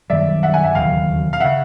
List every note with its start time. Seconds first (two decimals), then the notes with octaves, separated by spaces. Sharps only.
0.10 F#2 D#3 G3 D5 E5
0.43 E5 F#5
0.53 F#5 G#5
0.64 E5 F#5
0.75 E1 D#2 C#3 F#3 F5 G5
1.33 F5
1.40 C#3 E5 F#5